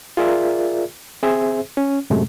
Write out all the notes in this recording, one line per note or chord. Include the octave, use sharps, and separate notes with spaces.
F4 G#4 A#4 D5 E5
C4 G#4 C5 E5
C#4
F#2 A2 C3 G#3 A3